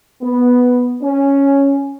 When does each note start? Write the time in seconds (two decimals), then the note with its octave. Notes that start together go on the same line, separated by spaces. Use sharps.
0.22 B3
1.02 C#4